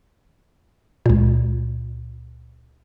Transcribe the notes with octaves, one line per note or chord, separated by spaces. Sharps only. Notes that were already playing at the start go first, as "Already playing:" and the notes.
C#2 A#2